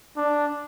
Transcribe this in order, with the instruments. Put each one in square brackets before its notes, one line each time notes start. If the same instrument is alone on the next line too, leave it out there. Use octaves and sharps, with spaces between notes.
[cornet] D4